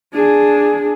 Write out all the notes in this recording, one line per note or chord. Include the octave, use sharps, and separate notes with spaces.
D4 G#4